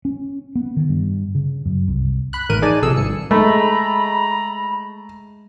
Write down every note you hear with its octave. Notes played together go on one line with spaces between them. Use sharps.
C#4
B3
D#3
G2
C#3
F#2
C2
B5 F#6
G#1 A2 E3 A#4 F#6 D#7
D#4 G#4 D5 G#5 A5
A#1 C3 G#4 A4 E6
G#1 G2 C#7
G#3 A3 A#5 B5